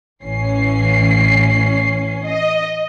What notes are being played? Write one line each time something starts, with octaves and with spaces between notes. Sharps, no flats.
A1 E3 C#4 C7
D#5